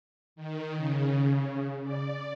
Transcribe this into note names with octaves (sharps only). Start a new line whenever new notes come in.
D#3
C#3
D5